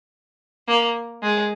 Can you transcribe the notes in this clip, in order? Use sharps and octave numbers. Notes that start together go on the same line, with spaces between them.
A#3
G#3